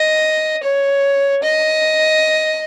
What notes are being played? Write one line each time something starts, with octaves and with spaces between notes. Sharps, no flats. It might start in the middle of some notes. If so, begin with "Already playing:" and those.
Already playing: D#5
C#5
D#5